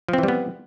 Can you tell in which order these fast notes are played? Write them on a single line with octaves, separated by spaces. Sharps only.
F3 C4 E3 G3 B3